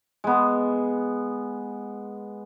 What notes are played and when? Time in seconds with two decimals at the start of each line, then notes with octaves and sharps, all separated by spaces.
0.24 G#3 B3